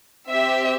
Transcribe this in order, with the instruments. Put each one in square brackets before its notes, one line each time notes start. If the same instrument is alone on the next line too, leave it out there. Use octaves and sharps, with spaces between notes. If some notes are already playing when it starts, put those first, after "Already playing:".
[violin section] C4 G4 E5